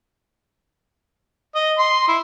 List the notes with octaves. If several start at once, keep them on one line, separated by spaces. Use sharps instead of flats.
D#5
C6
E4